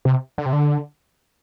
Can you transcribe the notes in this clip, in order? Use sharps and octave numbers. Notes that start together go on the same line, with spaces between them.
C3
D3
C3
D3